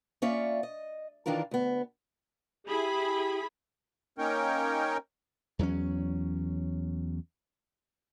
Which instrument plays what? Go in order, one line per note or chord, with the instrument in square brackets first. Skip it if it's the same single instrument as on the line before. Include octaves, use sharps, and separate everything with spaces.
[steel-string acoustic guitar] A#3 C#4 F4 C#5 D5 E5
D#5
D#3 E3 D4 F4 A#4
D2 B3
[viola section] E4 G#4 B5 [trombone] G4
[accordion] A#3 C#4 D#4 A#4 C#5 G5
[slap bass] E2 F#3 C4 C#4